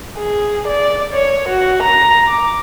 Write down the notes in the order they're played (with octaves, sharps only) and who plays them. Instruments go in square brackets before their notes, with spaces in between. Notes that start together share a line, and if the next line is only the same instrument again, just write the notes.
[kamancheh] G#4
D5
C#5
F#4
A#5
D6